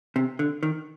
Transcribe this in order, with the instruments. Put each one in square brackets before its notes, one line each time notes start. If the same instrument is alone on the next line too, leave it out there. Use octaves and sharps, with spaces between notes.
[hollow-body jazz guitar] C3
D3
D#3